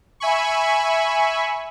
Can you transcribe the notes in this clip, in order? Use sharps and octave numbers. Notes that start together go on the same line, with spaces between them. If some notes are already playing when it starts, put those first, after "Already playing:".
E5 G#5 B5 C#6